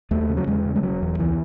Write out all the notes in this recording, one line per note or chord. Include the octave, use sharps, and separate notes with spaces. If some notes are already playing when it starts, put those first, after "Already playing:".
D#2 A3
C#3
F#3
E2 G#3
C#3
G#3
E1 F#3
E2
C#2 E3